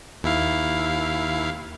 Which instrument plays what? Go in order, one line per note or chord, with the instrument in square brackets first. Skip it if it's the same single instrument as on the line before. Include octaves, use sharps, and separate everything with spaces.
[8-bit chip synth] D#2 E4 F5